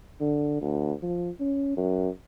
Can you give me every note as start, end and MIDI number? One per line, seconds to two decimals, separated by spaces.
0.20 0.58 50
0.61 0.93 38
1.03 1.30 53
1.41 1.75 61
1.77 2.09 42